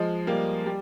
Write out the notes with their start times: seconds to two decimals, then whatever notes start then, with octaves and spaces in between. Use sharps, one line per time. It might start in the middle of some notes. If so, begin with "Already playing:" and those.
Already playing: F3 G#3
0.27 G3 A#3
0.66 G3